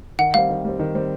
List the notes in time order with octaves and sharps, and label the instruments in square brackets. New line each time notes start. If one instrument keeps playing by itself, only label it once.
[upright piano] D#3 [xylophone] F#5
[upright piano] G3 C4 [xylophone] F5
[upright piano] D#3
G3 C4
D#3
G3 C4